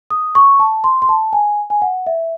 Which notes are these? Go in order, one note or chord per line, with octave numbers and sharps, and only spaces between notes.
D#6
C#6
A5
C6
C6
A5
G#5
G#5
F#5
E5